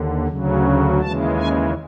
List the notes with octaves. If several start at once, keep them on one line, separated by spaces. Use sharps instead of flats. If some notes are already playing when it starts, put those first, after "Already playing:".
Already playing: D#2 D3
D2 C#3 F#3
D#2 C#3 E3 G#3 A5
G#5